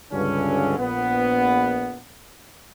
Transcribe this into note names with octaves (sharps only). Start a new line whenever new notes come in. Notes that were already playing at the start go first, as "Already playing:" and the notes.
C#2 G2 D3 C#4
A#1 B3